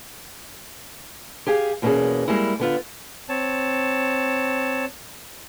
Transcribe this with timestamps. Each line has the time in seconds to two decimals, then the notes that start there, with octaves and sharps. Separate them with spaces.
1.46 G4 G#4 F5 G#5
1.82 E2 B2 A#3 B3 C#4 G#4
2.28 G3 G#3 A#3 E4
2.59 D3 B3 F4
3.29 C4 C#5 A5